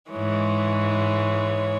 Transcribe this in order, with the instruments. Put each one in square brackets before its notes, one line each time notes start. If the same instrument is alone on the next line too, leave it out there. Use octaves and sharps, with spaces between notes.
[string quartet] G#2 E3 G#3 [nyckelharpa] C#5